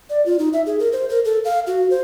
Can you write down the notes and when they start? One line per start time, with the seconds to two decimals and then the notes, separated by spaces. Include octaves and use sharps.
0.10 D5
0.26 F4
0.39 D#4
0.53 E5
0.66 G#4
0.80 A#4
0.92 C5
1.09 A#4
1.25 A4
1.45 F5
1.67 F#4
1.90 C5